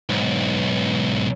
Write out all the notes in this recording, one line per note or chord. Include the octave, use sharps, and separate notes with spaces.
B1 G#2